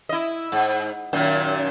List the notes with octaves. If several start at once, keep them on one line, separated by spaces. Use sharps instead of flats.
E4 D#5
G#2
F#2 A#2 D#3